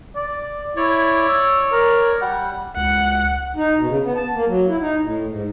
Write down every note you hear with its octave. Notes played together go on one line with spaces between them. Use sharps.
D5
E4 C#5 D5
E6
A#4
G3 F#5
C#2 F#5
D#4
B2
C#3
B3
A5
A#3
F#3
E4
D#4
A2
G#2